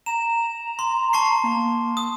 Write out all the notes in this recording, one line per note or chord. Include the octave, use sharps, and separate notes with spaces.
A#5 E7
C6
A5 C#6 C7
A#3
D#6